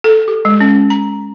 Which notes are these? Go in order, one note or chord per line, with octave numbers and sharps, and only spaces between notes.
A4
G4
G#3
C#4
A#5